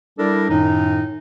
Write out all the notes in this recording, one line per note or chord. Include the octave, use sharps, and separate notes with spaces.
G3 D4 E4 A4 A#4 D5
F#2 A2 D#3 D#4